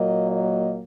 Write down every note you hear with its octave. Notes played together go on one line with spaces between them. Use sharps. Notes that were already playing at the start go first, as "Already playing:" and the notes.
Already playing: A#2 F#3 A#3 D#5
D#5